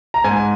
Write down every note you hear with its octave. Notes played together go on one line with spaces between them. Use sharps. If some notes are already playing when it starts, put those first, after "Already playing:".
A#5
G#2 G#5